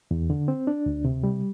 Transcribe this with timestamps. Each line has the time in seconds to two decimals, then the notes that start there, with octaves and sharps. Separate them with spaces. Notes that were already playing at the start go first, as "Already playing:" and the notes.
0.11 E2
0.30 D3
0.48 C4
0.67 D4
0.86 D2
1.05 C3
1.24 G3